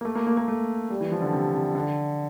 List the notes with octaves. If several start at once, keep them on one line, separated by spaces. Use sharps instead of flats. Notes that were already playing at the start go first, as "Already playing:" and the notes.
A#3
A3
A#3
A#3
A#3
A3
G3
E3
F3
D3
C3
C3
D3